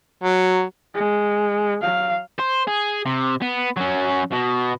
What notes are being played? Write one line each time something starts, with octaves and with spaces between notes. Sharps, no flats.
F#3
G#3
F#3 F5
C5
G#4
C3
B3
F#3 C#4
B2